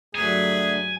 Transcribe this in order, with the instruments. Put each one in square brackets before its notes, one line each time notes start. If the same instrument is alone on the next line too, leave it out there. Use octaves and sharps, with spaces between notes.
[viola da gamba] G2 F#3 B4 [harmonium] D3 A3 [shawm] G#4 [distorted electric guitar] G#5